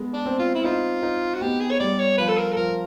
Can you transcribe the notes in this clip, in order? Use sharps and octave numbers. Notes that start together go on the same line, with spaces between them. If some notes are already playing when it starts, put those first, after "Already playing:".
Already playing: G#3 B3
D4
C4
F4
E4
D#4 F4
D#4
F#4
B3 G4
G#4
C#5
G3 D5
C#5
F3 B4
A4
A#4
A4
F3 A#4